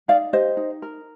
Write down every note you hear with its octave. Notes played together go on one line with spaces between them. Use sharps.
D#4 D5 F5
G4 C5 D#5
D#4
A#4